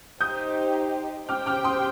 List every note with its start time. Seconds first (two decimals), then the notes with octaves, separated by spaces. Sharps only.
0.21 D#4 G4 C5 D#6 G6
1.29 G4 C5 G5 D6 F6
1.46 D6 F6
1.64 C6 D#6